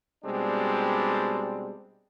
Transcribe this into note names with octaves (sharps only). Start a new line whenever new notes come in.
B2 G3 G#3 C4 D4